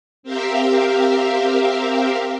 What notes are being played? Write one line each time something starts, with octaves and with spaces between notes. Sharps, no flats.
C4 G4 A#4 E5 F5